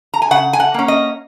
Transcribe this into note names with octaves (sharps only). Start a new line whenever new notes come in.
A#5
G#5
C#3 F#5
G#5
F#5
A#3 C#4
D#5